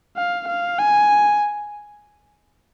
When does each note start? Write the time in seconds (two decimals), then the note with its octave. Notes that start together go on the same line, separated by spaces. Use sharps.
0.16 F5
0.48 F5
0.79 G#5